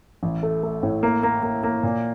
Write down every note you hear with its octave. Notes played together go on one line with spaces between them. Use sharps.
A1
A3
A3
A2
A#3
A#3
A#3
A#3
A#2